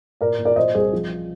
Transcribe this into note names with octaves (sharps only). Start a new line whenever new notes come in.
A#2 A#4 D5
A#2
A#4 D5
A#2 C5 D#5
C2 G#4 C5
F3